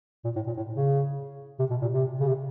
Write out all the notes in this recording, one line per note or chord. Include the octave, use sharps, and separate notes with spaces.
A#2
A2
A#2
A2
C#3
C3
B2
A#2
C3
C#3
C3